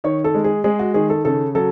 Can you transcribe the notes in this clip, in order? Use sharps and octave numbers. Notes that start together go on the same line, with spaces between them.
D#3 C#5
A4
G#3
G#4
G#3 G#4
F#4
D#3 G#4
A4
C#3 A4
F#3 A4